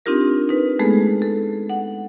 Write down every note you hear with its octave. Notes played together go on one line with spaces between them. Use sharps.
C4 D4 D#4 F4 G4 A#4
D#4 B4
G#3 A3 B3 G#4 A4
A4
F#5